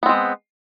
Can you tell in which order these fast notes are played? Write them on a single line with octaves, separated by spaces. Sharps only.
B3 C4 G#3